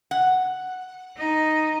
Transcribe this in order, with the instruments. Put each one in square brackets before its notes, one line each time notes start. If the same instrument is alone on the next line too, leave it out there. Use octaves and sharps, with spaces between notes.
[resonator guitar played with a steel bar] F#5
[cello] D#4